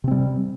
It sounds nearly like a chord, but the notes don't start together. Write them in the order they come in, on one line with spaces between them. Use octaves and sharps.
C3 C4 G3